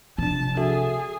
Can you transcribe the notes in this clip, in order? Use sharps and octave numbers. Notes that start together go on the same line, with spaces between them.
C3 F3 D4 A5
F#4 G#4 A4 E5